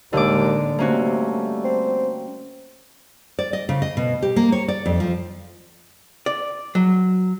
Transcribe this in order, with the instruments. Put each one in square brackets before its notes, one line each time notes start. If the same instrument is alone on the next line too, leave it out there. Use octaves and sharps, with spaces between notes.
[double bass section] A1 G#3 A#3 [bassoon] D#2 [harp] D3 D6
[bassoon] C3 [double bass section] G3 A3 [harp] A#3 C#4 F#4
[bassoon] C4
[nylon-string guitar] D5
D#5
C#3
D#5
B2
G4
A#3
C#5
D5
F2
F3
[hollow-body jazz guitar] D5
F#3